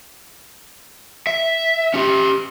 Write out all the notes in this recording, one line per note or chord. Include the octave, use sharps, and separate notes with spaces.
E5
C#4 G4